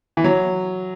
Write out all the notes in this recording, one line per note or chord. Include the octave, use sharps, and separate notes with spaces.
E3
F#3